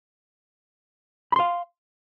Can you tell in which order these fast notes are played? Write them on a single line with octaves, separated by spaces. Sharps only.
B5 C6 F5